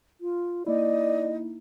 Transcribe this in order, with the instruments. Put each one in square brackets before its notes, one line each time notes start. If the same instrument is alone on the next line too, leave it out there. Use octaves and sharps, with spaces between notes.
[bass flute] F4
[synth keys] A#3 D#4 E4 [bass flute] D5 [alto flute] D#5